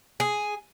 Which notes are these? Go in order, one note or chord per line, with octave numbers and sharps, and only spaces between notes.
G#4